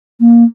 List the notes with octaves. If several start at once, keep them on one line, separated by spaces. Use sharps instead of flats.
A#3